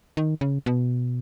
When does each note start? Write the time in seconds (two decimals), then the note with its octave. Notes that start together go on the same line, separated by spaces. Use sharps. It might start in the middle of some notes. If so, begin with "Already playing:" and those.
0.17 D#3
0.41 C#3
0.66 B2